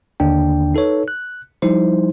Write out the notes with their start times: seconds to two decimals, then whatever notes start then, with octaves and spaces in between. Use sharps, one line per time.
0.20 D#2 D3 D4 G5
0.75 D#4 A4 B4 C#5
1.08 F#6
1.62 F3 G3 D#4 E4 C5